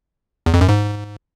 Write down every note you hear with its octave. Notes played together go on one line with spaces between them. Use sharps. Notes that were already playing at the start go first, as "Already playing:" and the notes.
E2
F2
F#2
G#2